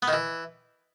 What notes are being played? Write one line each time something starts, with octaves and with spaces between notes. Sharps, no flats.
B3
D#3
E3